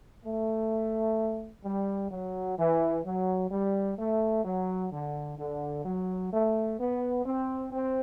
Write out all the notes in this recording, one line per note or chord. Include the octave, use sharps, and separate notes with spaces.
A3
G3
F#3
E3
F#3
G3
A3
F#3
D3
D3
F#3
A3
B3
C4
C4